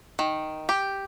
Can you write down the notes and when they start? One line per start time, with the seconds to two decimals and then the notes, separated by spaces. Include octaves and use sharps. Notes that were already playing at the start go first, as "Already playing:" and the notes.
0.19 D#3
0.69 G4